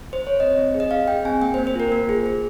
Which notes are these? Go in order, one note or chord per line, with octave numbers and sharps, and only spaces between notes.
C5
C#5
C4 D#5
C4
G#4
D#5
G#4 F5
G#4 G5
C4 G#5
A#3 G5
C5
A#3
C5
F4 A#4
A#3
G#4
G#4